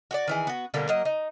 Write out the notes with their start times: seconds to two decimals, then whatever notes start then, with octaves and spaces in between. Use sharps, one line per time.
0.11 F#4 G4 D5
0.28 D#3 E3 G#4
0.47 B3 F#4
0.74 B2 D3 G3 A#3
0.89 F#3 A#3 D#5
1.05 D#4